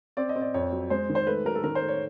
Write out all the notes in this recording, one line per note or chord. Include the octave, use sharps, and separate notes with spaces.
C4 D5
D#5
C4
D5
F2 C#5
F#3
G#3 C5
D#3
C5
A3 B4
F#3 A#4
A4
D#3 A#4
C5
A3
C#5